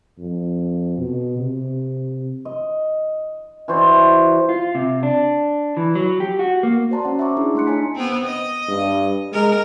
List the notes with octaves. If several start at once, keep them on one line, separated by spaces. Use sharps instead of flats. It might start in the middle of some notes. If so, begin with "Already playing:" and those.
F2
B2
C3
D#5
E3 F#4 C5 D5
F4
C3
D4
E3
F#3
G4
F#4
A#3
F#4 C5 D5 A5 A#5 C6
C#4 C#5 F#5
E5 F#5 A5 A#5 C#6 D6
D4 E4 G#4
A3 A#5 C6 F#6 C#7
D#4 C#5 G#5 A5 B6
B3 C4
D#5
G2
G#3 A#4